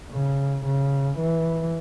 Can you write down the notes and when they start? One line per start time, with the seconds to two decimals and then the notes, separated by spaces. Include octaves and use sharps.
0.12 C#3
0.66 C#3
1.18 E3